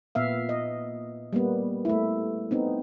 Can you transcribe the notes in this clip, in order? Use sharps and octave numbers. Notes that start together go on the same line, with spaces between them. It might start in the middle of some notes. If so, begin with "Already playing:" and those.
A#2 B3 E5 F5
D#5
G3 A#3 B3
A3 E4
B3 C4 D#4